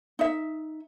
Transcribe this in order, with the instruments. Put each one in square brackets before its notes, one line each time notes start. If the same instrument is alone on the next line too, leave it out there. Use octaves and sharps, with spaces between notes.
[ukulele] D#4 E5